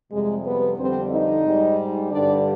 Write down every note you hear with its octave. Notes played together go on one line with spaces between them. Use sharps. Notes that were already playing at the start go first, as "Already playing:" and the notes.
F2 C3 G3 G#3 G#4
B3 B4
F2 D3 G3 C4 C5
D#4 D#5
G#2 G3
G2 D3 G3 D4 D5